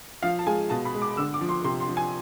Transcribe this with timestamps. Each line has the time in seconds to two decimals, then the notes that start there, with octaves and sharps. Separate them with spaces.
0.23 F3 F5
0.39 A5
0.47 G#3 G#5
0.70 B2 A5
0.85 B5
0.94 G#3
1.02 D6
1.17 D3 E6
1.34 D6
1.41 F3
1.49 C6
1.64 C3 C6
1.80 C6
1.89 F3
1.97 G#5